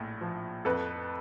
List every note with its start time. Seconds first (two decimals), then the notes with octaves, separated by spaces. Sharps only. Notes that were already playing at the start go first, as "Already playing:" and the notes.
Already playing: A#1 A2
0.21 F3
0.65 F2 A4 B4